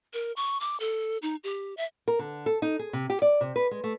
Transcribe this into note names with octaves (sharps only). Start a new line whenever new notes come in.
A#4
C#6
D6
A4
D#4
G4
E5
A#4
D3
A4
D#4
G#4
C3
G4
D5
C3
B4
G#3
A3